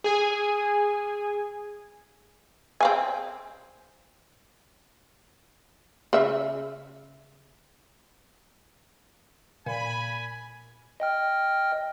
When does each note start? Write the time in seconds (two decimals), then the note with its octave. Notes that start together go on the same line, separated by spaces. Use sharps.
0.04 G#4 G#5
2.80 C4 F5 G#5
6.13 C#3 E5
9.66 A#2 G#5 B5
11.00 D#5 G5 F6